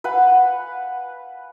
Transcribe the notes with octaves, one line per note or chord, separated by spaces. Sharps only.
B4 F5 F#5 G#5